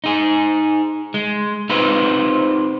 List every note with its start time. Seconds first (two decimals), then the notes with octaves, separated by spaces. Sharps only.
0.04 D#4 G#4
1.14 G#3
1.70 C4 D#4 F4 G4 B4